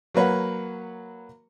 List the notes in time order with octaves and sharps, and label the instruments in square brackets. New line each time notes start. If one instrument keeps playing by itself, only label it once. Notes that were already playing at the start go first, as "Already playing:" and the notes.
[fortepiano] F#3 A#3 B4 C#5 F#5